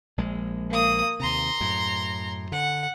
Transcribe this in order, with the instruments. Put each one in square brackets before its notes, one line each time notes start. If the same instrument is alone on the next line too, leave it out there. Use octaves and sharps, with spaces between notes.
[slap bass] A#1 G#3
[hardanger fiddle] A#3 D#6
[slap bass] D#2 C3 [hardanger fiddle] A#5 C6
[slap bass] F#2 A2
[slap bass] D3 [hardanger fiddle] F#5